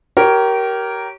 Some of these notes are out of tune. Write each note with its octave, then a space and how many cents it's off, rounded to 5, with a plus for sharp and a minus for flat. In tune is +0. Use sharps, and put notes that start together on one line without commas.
G4 -25 A#4 +0 C#5 +0